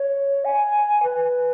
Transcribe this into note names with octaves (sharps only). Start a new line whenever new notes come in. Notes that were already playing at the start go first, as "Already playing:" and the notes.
Already playing: C#5
G#5
B4